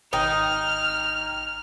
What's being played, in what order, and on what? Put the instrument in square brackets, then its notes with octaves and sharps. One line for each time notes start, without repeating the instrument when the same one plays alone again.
[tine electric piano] G#1 G5 [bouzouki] D#4 [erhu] F6